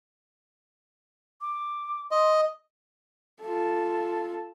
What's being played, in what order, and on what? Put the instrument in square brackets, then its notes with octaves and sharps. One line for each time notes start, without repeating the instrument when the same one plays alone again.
[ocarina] D6
[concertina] D#5 [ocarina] C6
[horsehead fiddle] F4 A4